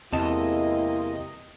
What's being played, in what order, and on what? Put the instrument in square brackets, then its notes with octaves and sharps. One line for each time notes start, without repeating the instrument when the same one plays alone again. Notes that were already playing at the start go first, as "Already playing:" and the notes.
[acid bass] E2 [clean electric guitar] C3 C4 A5 [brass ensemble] G#3 A#3 E4 [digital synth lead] D#5